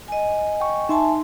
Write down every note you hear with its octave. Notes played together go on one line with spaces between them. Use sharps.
D#5 G#5
G5 C#6
D#4 E5 G#5 A5 C6